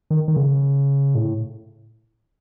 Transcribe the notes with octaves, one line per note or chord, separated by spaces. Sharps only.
D#3
D#3
C#3
A2